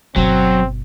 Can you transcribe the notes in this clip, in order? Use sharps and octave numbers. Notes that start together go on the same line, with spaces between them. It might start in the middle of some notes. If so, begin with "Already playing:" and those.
G1 B2 F#3 C4